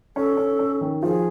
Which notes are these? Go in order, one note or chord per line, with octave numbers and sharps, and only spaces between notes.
C#4 A4
C#4
C#4
D#3
F3 G#4